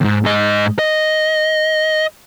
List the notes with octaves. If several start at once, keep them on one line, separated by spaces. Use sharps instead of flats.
D#2 G#2
G#2 D#5
D#5